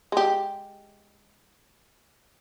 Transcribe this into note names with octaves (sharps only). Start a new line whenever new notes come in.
G#3 G4